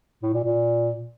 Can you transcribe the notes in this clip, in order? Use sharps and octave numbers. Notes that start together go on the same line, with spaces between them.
A2
A#2
A#2